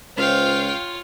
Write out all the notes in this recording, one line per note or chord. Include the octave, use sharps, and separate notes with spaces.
C#2 F4 C5 C#5 F5 G5